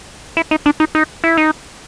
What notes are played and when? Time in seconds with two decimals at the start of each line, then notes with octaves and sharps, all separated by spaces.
0.37 E4
0.51 D#4
0.66 D4
0.80 D#4
0.95 D#4
1.24 E4
1.37 D#4